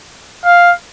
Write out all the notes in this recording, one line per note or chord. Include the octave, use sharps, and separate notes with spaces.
F5